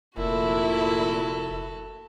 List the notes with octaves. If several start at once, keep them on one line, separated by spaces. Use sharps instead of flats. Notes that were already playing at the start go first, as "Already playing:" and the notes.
F1 A#2 E4 F#4 A4